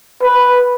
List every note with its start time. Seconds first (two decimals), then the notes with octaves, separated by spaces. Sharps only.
0.22 B4